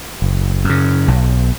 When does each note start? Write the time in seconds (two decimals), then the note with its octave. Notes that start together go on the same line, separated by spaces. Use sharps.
0.22 F#1
0.64 F#2
0.69 C#3
1.08 B1